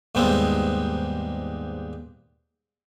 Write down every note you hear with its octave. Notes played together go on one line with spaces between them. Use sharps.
D#2 G#2 G3 G#3 B3 C4